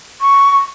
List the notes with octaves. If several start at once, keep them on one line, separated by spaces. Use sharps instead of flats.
C#6